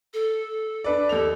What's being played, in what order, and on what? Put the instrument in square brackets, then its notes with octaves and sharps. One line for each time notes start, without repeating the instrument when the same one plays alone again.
[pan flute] A4
[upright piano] D4 B4 D5
[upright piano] D#2 F7 [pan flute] A4